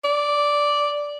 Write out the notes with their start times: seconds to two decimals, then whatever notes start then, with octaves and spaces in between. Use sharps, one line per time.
0.04 D5